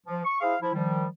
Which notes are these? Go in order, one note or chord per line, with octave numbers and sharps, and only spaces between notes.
F3
C#6
E4 G#4 C5 F5
F3 E4
D#3 F3 G3